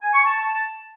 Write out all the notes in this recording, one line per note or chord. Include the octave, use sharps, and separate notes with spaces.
G#5
C#6
A5
A5